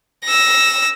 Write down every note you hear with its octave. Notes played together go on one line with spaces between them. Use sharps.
E6 A#6